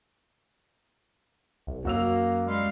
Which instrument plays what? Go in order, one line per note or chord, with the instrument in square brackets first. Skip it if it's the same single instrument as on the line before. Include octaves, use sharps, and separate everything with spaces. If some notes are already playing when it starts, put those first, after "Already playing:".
[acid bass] C2
[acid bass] F#2 [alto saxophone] A#3 [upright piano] F#4 E6 F7
[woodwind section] G3 G#3 F5